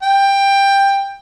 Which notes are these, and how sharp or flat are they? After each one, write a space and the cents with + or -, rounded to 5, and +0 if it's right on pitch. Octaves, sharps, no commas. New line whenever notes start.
G5 +15